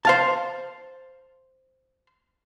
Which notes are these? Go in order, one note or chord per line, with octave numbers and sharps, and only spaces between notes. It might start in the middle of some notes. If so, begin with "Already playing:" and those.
C5 F5 A5